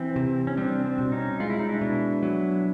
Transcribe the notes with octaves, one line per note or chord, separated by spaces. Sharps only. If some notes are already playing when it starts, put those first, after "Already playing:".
Already playing: E3 C4
C3
C#4
G3 C4 D4
C4 D4
B2
C#4 D#4
G#3 F4
E4
D#4
D4 E4
B2
F#3